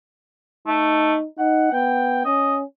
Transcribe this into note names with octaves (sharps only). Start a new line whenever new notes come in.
A3 D#4
D#4 F#5
B3 G5
C#4 D#5